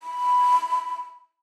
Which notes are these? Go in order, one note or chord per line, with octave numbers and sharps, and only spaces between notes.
B5